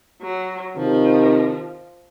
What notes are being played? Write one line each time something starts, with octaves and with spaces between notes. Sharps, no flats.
F#3
C3 D#3 F3